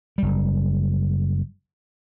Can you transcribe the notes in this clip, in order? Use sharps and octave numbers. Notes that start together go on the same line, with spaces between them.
F#1 G3